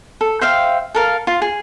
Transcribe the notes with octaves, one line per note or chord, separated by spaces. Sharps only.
A4
C5 E5 F5 G5
A4 A#4 F5
F4
G#4